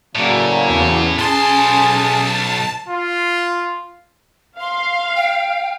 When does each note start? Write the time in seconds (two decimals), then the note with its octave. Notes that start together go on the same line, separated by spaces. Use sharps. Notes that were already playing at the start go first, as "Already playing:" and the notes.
0.15 A2 C#3 F#3 A#3 D5
0.69 E2 C#4
1.18 B1 G#4 G#5 A5 C6
2.89 F4
4.60 F5 C6
5.15 G5